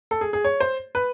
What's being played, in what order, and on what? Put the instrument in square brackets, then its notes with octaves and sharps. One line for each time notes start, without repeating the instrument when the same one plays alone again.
[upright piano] A4
G#4
G#4
C#5
C5
B4